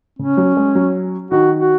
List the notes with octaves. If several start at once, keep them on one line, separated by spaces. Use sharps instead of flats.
C#3 C#4
F#3
G#3
F#3
D#3 F#4
F#4